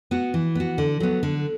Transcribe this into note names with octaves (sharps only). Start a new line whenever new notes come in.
B3 F#4
E3
B3 F#4
D3
F#3 B3
D3